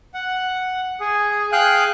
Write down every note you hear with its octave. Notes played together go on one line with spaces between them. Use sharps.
F#5
G#4
G#4 F5 G5 F#6